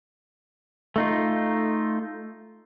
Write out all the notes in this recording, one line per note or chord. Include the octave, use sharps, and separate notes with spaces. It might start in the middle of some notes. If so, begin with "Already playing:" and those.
A3 D#4 F4